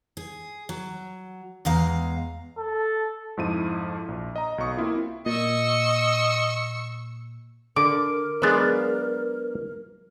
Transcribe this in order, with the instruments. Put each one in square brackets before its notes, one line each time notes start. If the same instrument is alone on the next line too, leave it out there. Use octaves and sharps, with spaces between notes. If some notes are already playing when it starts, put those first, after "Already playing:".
[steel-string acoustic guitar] G#4
F#3
E2 G#3 F5 A#5
[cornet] A4
[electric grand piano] F2 G#2 F3 E4 D#7
A#1
D#5 A#5
B1 F#3 C#6 D#6
A#3 C4 E4 F4
[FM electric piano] A#2 [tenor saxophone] D#5 [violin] C#6 E6
[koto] D3 [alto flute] A#4 [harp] D6
[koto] F#3 G#3 [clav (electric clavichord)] B3 D4 F5